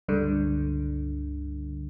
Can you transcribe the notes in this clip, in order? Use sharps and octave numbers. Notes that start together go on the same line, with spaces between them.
C#2 G2 D3